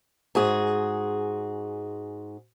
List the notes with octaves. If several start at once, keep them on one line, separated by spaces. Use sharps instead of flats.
G#2 F#4 G#4